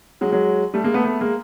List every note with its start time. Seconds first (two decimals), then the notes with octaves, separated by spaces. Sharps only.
0.21 F#3 G#3
0.32 F#3 G#3
0.74 G3 A3
0.84 G#3 A#3
0.94 A3 B3
1.05 A3 B3
1.21 G#3 A#3